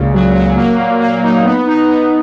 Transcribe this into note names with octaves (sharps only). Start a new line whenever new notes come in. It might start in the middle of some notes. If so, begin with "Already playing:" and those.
Already playing: C#2 A#2 C#3
F#3
F#3
A#3
A#2
A#3
D#4
B3
D#4
B3